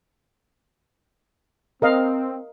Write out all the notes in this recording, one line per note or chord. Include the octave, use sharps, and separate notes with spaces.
C4 A#4 D#5 F5